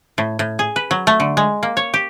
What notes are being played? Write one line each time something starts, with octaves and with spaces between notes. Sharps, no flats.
A2
A2
G#4
B4
F#3
A3
D3
G#3
A#3
C#5
G4